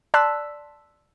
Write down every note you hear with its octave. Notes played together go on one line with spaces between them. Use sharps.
D5 A5 C6 E6 F#6 B6